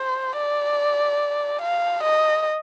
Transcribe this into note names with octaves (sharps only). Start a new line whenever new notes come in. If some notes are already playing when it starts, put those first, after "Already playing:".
Already playing: C5
D5
F5
D#5